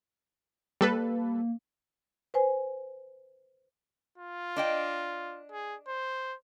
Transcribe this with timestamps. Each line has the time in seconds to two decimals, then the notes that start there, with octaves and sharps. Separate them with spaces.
0.81 G3 A#3 A4 B4
2.34 B4 C5 G#5
4.18 F4
4.56 D4 D#5 G5
5.52 G#4
5.88 C5